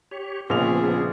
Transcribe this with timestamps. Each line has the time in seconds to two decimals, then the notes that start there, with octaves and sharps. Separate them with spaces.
0.11 G4 C#5
0.50 A#1 C#3 F3 B3 C4 G#4 F7